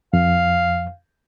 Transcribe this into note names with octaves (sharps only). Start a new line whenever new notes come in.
F2 F5